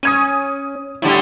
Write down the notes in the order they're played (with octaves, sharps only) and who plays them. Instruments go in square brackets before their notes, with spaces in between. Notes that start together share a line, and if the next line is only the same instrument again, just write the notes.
[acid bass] C#4 [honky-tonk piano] D#6 G#6 D#7
[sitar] A2 D3 G3 [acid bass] E4